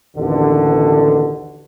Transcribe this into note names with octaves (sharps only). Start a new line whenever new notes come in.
A1 D#2 B2 D3